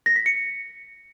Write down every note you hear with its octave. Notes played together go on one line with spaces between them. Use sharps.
A#6
B6
C#7